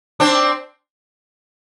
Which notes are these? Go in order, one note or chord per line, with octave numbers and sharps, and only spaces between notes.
C4 D4